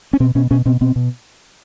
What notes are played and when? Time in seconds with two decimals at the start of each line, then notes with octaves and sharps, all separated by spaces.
0.13 C#4
0.20 B2 C4
0.35 B2 C#4
0.51 B2 C#4
0.66 B2 C4
0.81 B2 C4
0.96 B2